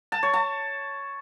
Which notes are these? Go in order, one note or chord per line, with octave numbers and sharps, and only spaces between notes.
A5
C#5
A5